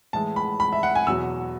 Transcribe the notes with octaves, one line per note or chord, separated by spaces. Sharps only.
A2 E3 G#3 A5
B5
B5
E5
F#5
G#5
E2 B2 F#3 E6